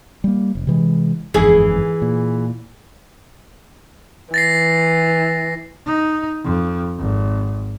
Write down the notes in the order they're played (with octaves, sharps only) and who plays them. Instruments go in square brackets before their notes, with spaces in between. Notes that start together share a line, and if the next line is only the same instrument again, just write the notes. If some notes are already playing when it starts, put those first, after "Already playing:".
[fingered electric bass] G3 A#3
F1
C3 E3 G#3
[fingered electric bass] G1 F2 G#2 [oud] E3 G#4
[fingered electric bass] A#2
[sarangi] E3 [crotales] A6 A#6 C7
[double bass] D#4
F2
G#1